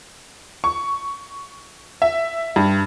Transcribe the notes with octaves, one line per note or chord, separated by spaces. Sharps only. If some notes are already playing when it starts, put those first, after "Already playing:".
C#6
E5
G2